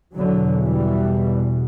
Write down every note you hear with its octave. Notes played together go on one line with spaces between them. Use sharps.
E2 B2 D3 F#3
E3 G3